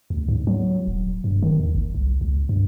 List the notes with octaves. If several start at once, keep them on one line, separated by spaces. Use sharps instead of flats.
D2
G#2
F#3
D#1
G2
D#3
D#2
G1
C2
C#2
G2